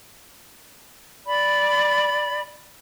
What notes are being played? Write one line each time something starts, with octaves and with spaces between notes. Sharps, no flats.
D5 B5